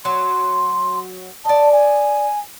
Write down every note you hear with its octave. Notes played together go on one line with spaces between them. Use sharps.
F#3 C6
D5 D#5 A5
G#5